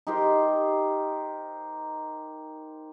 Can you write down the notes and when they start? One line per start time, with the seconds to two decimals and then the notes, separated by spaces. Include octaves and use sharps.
0.07 D#4 G4 A#4 C5